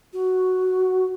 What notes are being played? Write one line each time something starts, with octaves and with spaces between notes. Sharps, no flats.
F#4